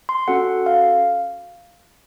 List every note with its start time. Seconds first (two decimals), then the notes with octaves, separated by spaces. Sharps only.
0.09 C6
0.28 C#4 F#4 A4 F#5
0.66 F5